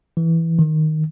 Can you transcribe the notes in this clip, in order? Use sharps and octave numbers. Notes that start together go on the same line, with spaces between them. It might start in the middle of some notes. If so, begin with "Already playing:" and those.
E3
D#3